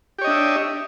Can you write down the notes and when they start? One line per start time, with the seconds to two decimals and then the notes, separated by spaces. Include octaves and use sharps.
0.18 G4
0.21 C#5
0.24 D#5
0.27 D4
0.30 E5